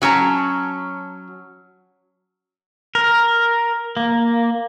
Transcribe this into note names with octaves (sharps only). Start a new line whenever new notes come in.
F#3 C#4 A5 A#5
A#4
A#3